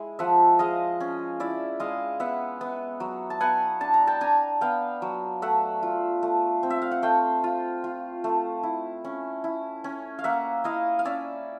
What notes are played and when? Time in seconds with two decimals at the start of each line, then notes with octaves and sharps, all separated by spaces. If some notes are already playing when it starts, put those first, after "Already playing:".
Already playing: G#3 E4
0.19 F3 E5 F#5
0.59 G#3 D#5 F5
1.00 C#4
1.40 E4 D5 E5
1.80 G#3 D#5 F5
2.20 B3 E5 F#5
2.61 B3
3.00 F#3
3.30 A5
3.41 B3 F#5 G#5
3.81 D4 A5
3.94 A#5
4.07 G5 A5
4.21 D4 G#5 A#5
4.61 B3 F5 G5
5.02 F#3
5.42 A3 E5 F#5
5.83 F4
6.23 A3
6.63 C4
6.70 E5
6.82 F5
6.91 F#5
7.02 A3 F5 G5
7.44 F4
7.84 F4
8.24 A3
8.63 E4
9.04 C#4
9.44 E4
9.84 C#4
10.19 F5
10.24 A#3 E5 F#5
10.64 E4 D#5 F5
10.99 F5
11.05 C#4 D5 E5